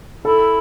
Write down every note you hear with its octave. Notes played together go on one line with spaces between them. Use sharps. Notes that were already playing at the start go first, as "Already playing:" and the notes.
E4 A4